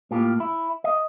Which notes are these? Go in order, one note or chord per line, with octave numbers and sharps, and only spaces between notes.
A2 A#3 F4 G4
E4
D#5